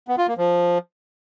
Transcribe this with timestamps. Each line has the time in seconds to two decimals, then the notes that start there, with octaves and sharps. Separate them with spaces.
0.08 B3
0.18 F4
0.28 A#3
0.37 F3